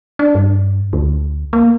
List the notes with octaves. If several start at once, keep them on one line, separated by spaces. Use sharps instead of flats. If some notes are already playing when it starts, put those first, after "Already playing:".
D4
G2
D2
A#3